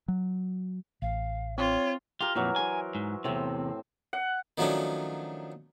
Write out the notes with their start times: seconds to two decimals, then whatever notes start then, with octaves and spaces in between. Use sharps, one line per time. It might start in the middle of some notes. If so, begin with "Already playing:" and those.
0.08 F#3
1.02 A1 F5
1.58 C4 F4 C#5
2.21 F4 G4 A#4
2.36 F2 A#2 E3 F#3
2.56 A#4 C5 G#5
2.95 G#2
3.24 E2 A2 C3 C4
4.13 F#5
4.58 D#3 F3 F#3 A3 C#4 D4